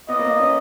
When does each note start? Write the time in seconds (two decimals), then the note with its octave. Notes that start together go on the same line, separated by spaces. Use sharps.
0.09 B3 D#5
0.19 A#3
0.24 B3
0.40 C#4